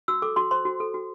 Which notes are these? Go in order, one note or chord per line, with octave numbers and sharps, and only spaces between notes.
F#4 E6
A4 D6
F#4 C6
C5 C6
F#4
A4
F#4